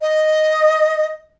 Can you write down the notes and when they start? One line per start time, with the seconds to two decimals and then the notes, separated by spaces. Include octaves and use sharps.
0.01 D#5